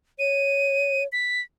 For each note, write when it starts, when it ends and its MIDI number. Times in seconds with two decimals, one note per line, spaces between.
0.19 1.06 73
0.19 1.04 99
1.12 1.41 95